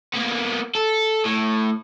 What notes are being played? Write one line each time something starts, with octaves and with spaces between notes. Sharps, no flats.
A#3 B3
A4
A2